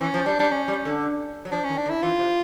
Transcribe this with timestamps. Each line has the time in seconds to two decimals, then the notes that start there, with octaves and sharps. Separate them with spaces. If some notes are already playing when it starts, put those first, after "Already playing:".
0.01 E3 C#4
0.14 F3
0.26 G3 D4
0.39 G3 D4
0.51 C#4
0.68 G3
0.85 D3
1.45 F#3
1.52 F3 D4
1.64 D#3 C#4
1.78 D4
1.86 D3
1.90 E4
2.03 E3 F4
2.19 C3